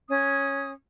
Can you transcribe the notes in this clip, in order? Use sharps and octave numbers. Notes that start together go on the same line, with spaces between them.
C#4 D#6